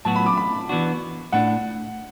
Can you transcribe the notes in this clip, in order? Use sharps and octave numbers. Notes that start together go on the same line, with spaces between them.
A2 F#3 B3 F#4 A5
B5
D6
B5
E3 B3 D4 F#4
A2 A3 D4 F#5